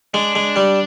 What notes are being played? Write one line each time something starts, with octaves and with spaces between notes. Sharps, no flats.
G#3 D4
G#3
G3